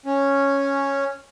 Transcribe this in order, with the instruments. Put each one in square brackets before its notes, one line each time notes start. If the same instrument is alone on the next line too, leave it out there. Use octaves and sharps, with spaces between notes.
[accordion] C#4